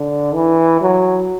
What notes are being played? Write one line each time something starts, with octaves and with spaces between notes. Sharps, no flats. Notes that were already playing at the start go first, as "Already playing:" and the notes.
Already playing: D3
E3
F#3